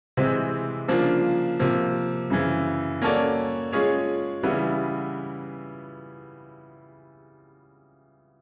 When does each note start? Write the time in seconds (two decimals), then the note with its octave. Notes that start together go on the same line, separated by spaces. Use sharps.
0.17 C3 E3 G#3 C4
0.88 C#3 F3 A#3 D4 F4
1.59 C3 F3 A#3
2.30 F#2 C#3 E3
3.01 A#3 C#4 F#4 A4 D5
3.72 G#3 C#4 F4 G#4 C#5
4.43 C#3 E3 G3 B3 E4